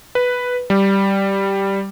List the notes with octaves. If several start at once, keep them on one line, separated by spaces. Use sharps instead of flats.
B4
G3